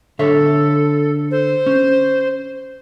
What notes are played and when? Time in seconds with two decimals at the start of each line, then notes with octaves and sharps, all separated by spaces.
0.19 D3 A4 C#5 E5
1.31 C5
1.66 C#4